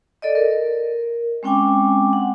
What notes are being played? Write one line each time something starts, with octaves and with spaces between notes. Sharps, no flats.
A4 D5 D#5
A#4
G#3 C4 C#4 G5 G#5 D6
F#5